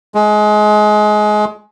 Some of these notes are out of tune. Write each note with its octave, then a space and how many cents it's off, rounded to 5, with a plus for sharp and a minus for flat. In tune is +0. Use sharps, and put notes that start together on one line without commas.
G#3 +25